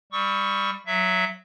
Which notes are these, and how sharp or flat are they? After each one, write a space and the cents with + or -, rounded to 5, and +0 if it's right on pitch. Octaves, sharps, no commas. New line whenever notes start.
G3 +15 C#6 +0 E6 -40
F#3 +0 E5 +15